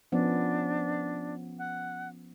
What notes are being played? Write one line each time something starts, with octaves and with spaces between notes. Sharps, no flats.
F3 B3 C#4 D4
F#5